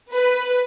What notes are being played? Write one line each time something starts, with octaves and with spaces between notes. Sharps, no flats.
B4